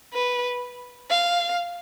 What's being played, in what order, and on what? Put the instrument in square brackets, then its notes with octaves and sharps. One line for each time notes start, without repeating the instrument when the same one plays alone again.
[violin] B4
F5